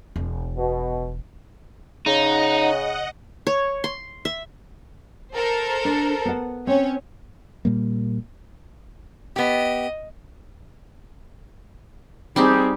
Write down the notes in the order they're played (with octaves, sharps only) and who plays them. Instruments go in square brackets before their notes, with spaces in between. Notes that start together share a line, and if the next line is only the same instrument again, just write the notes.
[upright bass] E1
[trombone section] B2
[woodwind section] C#3 [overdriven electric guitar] D#4 [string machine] D#5 F#5
[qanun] C#5
C6
E5
[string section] A4 A#4 C5
[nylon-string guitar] D4
B3 F#5
[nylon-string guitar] C4 [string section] C#4 C#5
[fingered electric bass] A#2 G3 A#3
[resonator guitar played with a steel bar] B3 G4 [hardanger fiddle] D#5
[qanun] G3 D#4 G4 [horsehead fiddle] C4 G#4